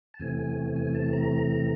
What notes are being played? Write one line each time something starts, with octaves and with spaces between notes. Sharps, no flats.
A5
E2 C3 E3 A3 C4 G#5
G#5
A5
A#5